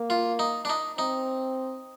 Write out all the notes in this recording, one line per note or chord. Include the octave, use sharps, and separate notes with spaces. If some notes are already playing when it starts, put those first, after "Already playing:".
Already playing: A#3
F4
D#4
D4
D#4
C4 D#4